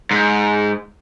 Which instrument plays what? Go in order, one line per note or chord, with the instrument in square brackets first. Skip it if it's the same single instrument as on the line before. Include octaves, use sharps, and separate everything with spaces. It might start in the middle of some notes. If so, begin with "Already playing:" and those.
[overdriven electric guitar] G#2